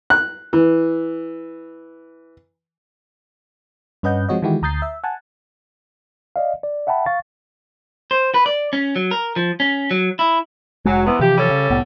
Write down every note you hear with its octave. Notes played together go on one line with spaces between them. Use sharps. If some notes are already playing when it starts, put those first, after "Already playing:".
F#6
E3
G2 C#4 B4 D#5 F#5 G6
F3 G#3 C4 F#4 C#5 D#5
D#3 E3 G#3 E4 F#4 G4
D2 A#5 D#6 G6 A6 C7
E5
F#5 G#5 A5
D5 D#5 F5
D5
E5 F#5 G5 A5 B5
F5 C#6 A6
C5
B4
D5
C#4
F#3
A#4
F3
C#4
F#3
E4
F1 F#3 G#3
C3 E3 B3
C3 E3 F3 G4
G3 C#4 A4
C#3
C2 A2 B3